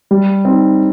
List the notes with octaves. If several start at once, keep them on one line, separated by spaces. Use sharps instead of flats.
G3
C4 D#4